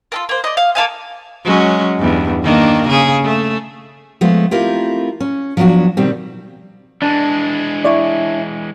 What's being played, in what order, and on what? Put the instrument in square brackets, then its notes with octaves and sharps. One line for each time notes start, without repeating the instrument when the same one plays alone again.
[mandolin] F4 A4 A#4
A#3 C5
D5 D#5
F5
A#3 A4 F5 G#5
[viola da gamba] F#3 G#3 C#4
E2 G2
D#3 A#3 D4
C#3 G#4
A3
[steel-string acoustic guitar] F3 G#3 A3 B3
A3 C4 E4 F4 G4 A#4
C#4
F3 F#3 B3 D4 F#4
B2 D#3 G3 C4
[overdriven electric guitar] E3 G#3 [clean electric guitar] D4
[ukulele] E4 C#5 D5